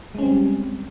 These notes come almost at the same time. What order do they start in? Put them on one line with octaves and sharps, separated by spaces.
G#3 C#4 C4 G3